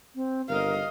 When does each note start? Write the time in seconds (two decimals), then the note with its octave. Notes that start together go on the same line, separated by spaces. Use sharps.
0.16 C4
0.49 G1 A#4 D#5 F5